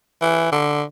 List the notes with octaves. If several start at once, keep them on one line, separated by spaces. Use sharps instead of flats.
E3
D3